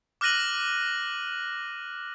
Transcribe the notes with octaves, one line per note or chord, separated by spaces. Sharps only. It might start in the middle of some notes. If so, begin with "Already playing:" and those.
D6 F6 F#6 A#6 D#7 F#7